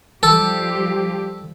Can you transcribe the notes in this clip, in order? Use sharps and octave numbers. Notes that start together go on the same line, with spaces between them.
F3 G3 G4 A4